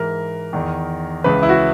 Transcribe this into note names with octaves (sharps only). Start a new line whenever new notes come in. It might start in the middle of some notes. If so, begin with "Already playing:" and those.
Already playing: G#2 E3 A#4
E2 D#3
C#2 C#3 E3 B4
E4
F#4